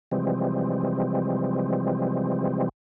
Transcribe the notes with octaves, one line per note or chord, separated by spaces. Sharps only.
C3 E3 F3 G3 G#3 C4